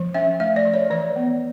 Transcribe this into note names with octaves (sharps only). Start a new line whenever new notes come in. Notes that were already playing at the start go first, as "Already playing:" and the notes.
Already playing: F3
C#4 E5
A3 E5
D5
F3
C#5
E3 D5
B3